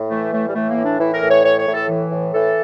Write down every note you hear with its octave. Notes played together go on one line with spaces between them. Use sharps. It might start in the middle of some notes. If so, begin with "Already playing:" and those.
Already playing: A2
E3 A3
A2 A3
G3
E3 A3
A#3
A2
D4
E3 E4
A#4
A2
C#5
E3 C#5
C#5
A2
A4
E3
A2
E3 A4